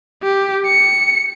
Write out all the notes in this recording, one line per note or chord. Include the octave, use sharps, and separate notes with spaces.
G4
C#7